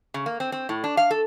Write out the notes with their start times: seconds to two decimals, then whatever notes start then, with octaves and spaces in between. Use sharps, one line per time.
0.14 C#3
0.26 A#3
0.40 C4
0.52 C4
0.69 A2
0.84 D4
0.97 F5
1.11 A4